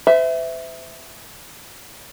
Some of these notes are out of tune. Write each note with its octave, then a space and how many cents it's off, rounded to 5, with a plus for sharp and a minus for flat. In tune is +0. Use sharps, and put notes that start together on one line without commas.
C5 -45 E5 +0